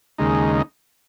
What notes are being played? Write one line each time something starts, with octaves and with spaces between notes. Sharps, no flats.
D#2 C#3 G#3 D#4